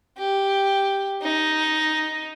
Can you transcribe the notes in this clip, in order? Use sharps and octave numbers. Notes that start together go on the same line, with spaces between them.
G4
D#4